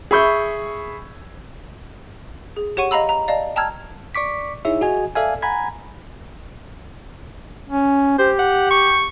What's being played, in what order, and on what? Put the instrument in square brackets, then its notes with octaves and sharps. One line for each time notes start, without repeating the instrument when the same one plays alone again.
[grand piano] G#4 E5 B5 C#6 G6
[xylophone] G#4
G4 C#5 F#5 C#6 D#7
D#5 F5 A#5 B5 E6
A#5
D5 D#5 F5 A5
G5 A5 A#5 E6 F6 G#6
[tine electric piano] D5 C#6 D6 B6
D#4 E4 G#4 C#5 E5
F#4 G#4 D#5 G#5
A4 D5 E5 F5 G#5
F#5 G#5 A#5 B5 G#6
[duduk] C#4
[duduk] G4 [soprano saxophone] C5
[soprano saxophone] F#5
C#6